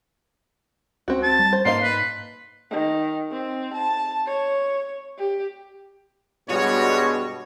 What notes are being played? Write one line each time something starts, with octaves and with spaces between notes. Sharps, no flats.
C#2 C4 F#4
A5
G3
C5
G#2 A#3 D#5 F5 C6
B4
D#3
C4
A5
C#5
G4
G2 B2 G3 G#3 B3 F#4 C#5